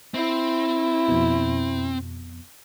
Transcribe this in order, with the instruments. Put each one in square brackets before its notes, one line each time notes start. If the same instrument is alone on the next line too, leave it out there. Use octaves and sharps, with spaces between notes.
[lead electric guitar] C4 [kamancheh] E4
[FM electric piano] F2 B2